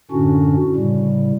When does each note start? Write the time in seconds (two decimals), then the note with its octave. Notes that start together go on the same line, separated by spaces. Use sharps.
0.11 F#2 A2 D3 C#4 D4 F#4
0.76 A2 C#3 G3